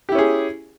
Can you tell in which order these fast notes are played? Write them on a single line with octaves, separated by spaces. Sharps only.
G4 E4 C#4 G#4